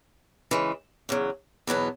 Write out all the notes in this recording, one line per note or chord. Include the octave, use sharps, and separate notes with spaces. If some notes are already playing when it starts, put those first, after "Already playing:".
C#3 E3 G#3
E2 C#3 F#3
E2 B2 F#3 B3